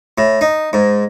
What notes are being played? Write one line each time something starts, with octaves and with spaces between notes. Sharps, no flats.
A2
D#4
G#2